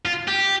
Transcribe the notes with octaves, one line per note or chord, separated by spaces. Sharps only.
F4
G4